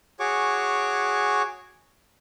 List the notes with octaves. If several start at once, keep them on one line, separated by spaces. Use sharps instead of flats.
F#4 G#4 C#5 C#6 D6